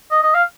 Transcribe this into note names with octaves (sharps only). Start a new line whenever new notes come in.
D#5
D#5
F5